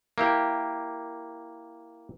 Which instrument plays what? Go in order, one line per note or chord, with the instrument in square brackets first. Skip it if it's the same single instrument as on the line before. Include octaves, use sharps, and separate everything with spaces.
[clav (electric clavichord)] A#3 E4 G4